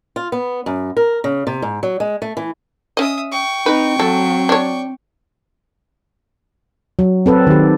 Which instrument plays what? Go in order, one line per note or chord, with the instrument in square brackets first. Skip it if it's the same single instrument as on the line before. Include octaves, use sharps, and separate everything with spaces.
[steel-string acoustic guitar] F4
B3
F#2
A#4
C#3
C3
G#2
F#3
G#3
A3
E3
[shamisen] C#4 D#5 [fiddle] E5 D#6
[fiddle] G5 C#6
[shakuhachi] C4 [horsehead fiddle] D#4 [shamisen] B4
[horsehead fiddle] F#3 [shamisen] A4
[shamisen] D4 C#5
[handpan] F#3
C4 A4 B4
D#3 G4